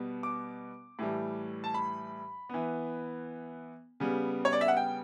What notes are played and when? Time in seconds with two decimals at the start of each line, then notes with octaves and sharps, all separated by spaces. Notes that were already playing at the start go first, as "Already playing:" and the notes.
Already playing: B2 G3 B3
0.23 D6
0.99 A2 E3 G3
1.64 A5
1.74 B5
2.49 E3 B3
4.00 C#3 G3 B3
4.45 C#5
4.53 D5
4.61 E5
4.68 F#5
4.77 G5